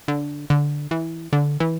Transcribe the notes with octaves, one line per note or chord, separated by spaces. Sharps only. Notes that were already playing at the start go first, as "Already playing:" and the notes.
D3
D3
E3
D3
E3